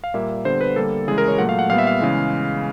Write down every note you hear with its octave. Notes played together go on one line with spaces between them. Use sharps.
F5
A#2 G3 A#3 E5
D3 G3 B3 C5
B4
D3 G3 A#3 A4
C#3 E3 G#3 G#4
A#4
C#5
A#2 F#3 A3 F#5
F5
F#5
A#2 G3 B3 F5
E5
F5
C#3 E3 G#3